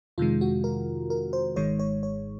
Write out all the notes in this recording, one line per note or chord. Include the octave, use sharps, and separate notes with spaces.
F2 C3 D#3 G#3 F4
F#4
A#4
A#4
C5
G#1 G#2 D#3 G#3 C#5
C#5
C#5